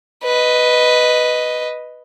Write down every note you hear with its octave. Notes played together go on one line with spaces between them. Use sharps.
B4 D#5